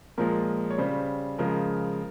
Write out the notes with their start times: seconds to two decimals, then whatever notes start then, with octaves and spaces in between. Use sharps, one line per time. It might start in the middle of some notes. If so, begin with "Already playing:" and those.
0.18 A#2 F3 G#3 A#4
0.71 C#5
0.78 C#3 G3 C5
1.39 C#3 F3 G#3 A#4